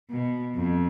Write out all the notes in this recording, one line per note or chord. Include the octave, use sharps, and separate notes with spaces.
B2
F2